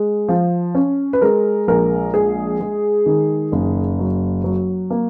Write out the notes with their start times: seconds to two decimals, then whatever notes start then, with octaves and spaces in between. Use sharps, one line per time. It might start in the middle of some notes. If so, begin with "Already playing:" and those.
Already playing: G#3
0.29 F3
0.75 C#4
1.13 B4
1.22 G#3 A#4
1.68 A#1 A#4
2.14 G#3 G#4
2.60 G#3
3.06 D#3
3.52 F#1
3.99 F#3
4.44 F#3
4.91 A#3